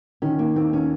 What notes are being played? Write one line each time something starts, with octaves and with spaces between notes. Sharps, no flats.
D#3 C#4
A#3
D#2 C4
C#4